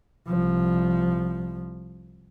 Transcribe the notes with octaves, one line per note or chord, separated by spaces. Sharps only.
C2 F3